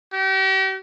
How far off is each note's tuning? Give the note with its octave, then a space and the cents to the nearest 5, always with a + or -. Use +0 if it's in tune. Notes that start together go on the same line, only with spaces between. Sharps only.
G4 -40